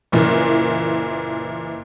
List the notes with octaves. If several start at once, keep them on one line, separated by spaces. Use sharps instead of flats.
F#1 A#2 E3